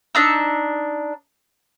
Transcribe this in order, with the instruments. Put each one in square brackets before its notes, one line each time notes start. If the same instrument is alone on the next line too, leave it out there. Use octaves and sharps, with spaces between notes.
[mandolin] D4 D#4 E6